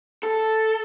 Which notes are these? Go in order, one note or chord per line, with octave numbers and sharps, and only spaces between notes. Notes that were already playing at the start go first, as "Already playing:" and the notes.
A4